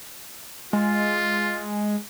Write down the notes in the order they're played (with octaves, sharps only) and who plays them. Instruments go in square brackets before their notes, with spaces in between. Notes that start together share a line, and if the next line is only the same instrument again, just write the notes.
[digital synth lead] G#3 [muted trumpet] F4